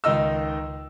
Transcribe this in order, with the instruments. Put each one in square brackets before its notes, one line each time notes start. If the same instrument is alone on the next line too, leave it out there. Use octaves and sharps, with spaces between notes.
[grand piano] C#2 D#3 D#4 D#5 E6